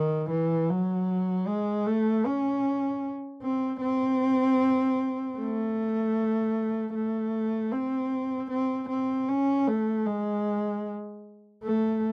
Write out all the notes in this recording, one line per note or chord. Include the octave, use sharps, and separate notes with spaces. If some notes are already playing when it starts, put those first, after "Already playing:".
Already playing: D#3
E3
F#3
G#3
A3
C#4
C4
C4
A3
A3
C4
C4
C4
C#4
A3
G#3
A3